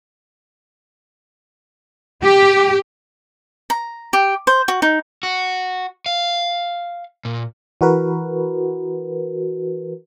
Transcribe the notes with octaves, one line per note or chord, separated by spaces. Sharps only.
G4
A#5
G4
C5
F#4
D#4
F#4
F5
A#2
E3 F#4 A#4 B4